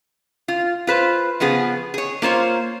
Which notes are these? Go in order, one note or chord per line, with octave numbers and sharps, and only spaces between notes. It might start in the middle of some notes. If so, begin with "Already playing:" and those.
F4
F4 B4 C5
C#3 F3 B3 G#4
G#4 C#5
A#3 F4 C5 C#5